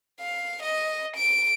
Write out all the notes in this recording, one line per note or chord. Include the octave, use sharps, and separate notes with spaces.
F5
D#5
D7